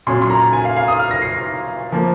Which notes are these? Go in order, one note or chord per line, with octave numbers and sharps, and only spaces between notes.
A#2 F#3 C#4 C6
C6
A#5
G#5
F5
F5
D#6
F6
A#6
C7
F3 A#3